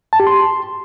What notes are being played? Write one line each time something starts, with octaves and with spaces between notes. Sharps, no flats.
A5
G4
C6